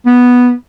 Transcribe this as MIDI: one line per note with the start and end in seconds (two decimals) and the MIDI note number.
0.06 0.53 59